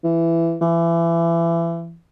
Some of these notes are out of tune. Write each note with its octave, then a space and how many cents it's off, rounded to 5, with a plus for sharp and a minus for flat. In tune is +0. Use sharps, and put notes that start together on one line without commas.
E3 +15
E3 +30